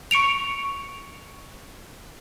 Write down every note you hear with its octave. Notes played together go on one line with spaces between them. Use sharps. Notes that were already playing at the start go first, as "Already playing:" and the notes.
C#6 C#7 D7 F7